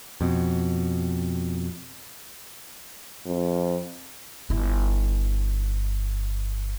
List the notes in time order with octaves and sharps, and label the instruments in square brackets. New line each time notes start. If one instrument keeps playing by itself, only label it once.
[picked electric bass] F2 B2
[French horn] F2
[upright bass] G1 E4